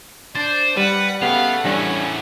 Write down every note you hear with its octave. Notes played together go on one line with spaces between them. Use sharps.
D4 C5 A6
G3 B4 F#5
C#3 A3 B3 G4 F5 F#5
E2 A2 G3 C#4 D4 A#6